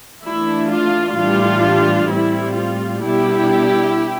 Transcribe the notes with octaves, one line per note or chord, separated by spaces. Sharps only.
E3 A3 D4 E4
F4
A2 E3 G3 D4 F4
A2 G3 C4 E4
F4
B2 G3 B3 D4 E4 G4